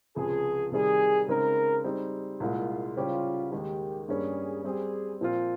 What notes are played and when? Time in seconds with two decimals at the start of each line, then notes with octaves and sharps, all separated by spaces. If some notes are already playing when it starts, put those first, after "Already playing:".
0.16 C#2 C3 F3 G#4
0.72 C3 D#3 G3 G#4
1.28 C#3 G#3 C4 D#4 A#4
1.84 G3 C4 D#4 G#4
2.40 C2 A#2 G#3 F4
2.96 C#3 G3 C#4 F4 G4 C5
3.52 D#2 D#3 G#3 G4
4.08 G2 G3 A#3 C#4 G#4
4.64 G3 C4 G4 G#4
5.21 A#2 F3 C4 F4